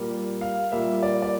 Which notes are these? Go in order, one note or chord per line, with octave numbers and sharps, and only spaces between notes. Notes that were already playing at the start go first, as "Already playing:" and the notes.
Already playing: A#2 G3 A#3
F5
A#2 G3 A#3 E5
D5
D5